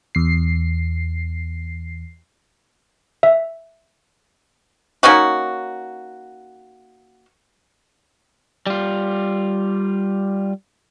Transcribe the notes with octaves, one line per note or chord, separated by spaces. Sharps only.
E2 C7
E5
A#3 C#4 D#4 F#4
G3 F4